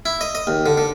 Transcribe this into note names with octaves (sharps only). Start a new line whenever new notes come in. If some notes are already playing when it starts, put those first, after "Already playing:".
E4
D#5
D#5
D#2
D3
D3